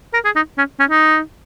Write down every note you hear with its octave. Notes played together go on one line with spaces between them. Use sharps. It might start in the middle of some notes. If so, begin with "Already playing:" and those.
A#4
G#4
D#4
C#4
C#4
D#4